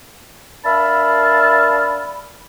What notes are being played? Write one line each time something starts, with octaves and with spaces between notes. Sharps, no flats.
D4 A#4 E5 F5 A5 B5